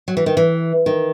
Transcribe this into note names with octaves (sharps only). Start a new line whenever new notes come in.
F#3
E3
D#3
E3
D#3